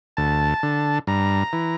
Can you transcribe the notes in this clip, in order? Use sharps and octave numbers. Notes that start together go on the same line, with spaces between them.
D2 A5
D3
G2 A#5
E3